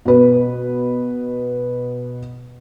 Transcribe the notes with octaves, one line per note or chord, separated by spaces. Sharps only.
B2 B4